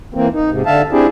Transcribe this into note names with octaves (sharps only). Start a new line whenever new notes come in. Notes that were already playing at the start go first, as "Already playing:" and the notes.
E3 A#3 C4
D#4
G#2 C3
D3 E5 F5 A5
C4 D4 E4 G4 G#4